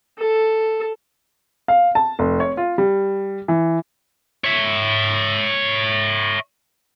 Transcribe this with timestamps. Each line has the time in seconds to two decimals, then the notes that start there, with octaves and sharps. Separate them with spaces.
0.19 A4
1.68 F5
1.95 A5
2.19 F1
2.40 C#5
2.57 F4
2.78 G3
3.48 E3
4.45 C#5 E5